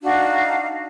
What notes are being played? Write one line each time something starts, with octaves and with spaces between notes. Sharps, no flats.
D4 D#4 F#4 F5